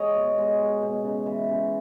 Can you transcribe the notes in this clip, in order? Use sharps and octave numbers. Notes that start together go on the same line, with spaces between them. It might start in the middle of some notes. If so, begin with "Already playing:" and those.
Already playing: G#3 C#5 D#5
B2
G#3
G#3
B2
C#3
E3
C#3